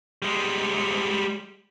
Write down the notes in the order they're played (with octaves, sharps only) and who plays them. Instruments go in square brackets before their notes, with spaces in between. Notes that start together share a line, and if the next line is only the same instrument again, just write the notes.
[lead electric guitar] G3 G#3